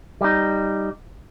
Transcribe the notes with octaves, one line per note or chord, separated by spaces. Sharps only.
G3 D#4